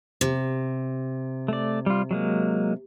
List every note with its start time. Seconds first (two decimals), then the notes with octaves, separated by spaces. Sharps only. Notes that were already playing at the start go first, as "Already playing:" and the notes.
0.21 C3
1.48 A3 D5
1.86 G3 F4
2.11 F#3 G#3 A#3